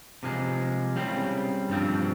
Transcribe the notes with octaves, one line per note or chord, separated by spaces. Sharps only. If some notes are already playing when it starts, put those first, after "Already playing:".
C3 F3 G#3
C#3 G3 C4
G2 F3 C4